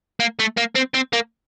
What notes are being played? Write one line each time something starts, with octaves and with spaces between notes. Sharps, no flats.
A#3
A3
A#3
C4
C4
A#3